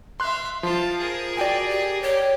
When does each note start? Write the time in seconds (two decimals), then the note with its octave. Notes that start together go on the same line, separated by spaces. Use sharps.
0.20 E5 F5 C6 F#6
0.63 F3 F4 A5
0.99 G#4 A#4
1.37 F#4 D5 G5 G#5
1.69 G4
2.02 G4 C#5